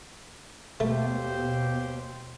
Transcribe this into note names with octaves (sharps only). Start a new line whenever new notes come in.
D#2 B2 A3 G4 C5